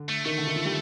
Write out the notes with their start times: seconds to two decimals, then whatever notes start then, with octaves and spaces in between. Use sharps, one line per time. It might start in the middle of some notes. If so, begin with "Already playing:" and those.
Already playing: D3
0.09 A3
0.25 D#3 A3
0.38 D3
0.47 D#3
0.56 F3
0.65 G3